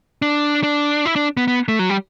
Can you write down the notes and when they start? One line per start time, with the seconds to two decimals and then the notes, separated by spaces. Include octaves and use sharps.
0.22 D4
0.63 D4
1.05 E4
1.16 D4
1.37 B3
1.48 B3
1.68 A3
1.79 F#3
1.90 G3